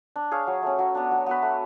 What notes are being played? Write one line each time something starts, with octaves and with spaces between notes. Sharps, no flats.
D4
G#4 C#5 F5
F#3
A3 C#4
F#3
B3 D4
F#3
B3 F#4 B4
A3